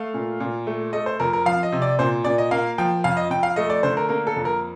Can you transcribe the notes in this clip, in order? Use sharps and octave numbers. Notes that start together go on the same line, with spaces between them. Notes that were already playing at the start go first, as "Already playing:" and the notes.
Already playing: A3 F5
A#2
A#2
A3
A3 D#5
C5
F2 A#4
A#4
F3 F5
D#5
C3
D5
A#2 C5
A#2 D5
D#5
A#3 F5
F3 G5
F2 F5
D#5
F2 G5
F5
A3 D#5
D5
D3 C5
A#4
A#3 A#4
A4
F2
A#4